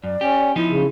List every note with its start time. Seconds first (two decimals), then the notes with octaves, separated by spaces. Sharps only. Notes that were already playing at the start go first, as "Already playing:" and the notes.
0.04 F#2 D5
0.21 C#4 G4
0.56 F3 B3 D#4 E4
0.69 C#3